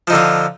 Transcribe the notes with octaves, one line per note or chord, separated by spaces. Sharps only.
D3 F3 D#4 F4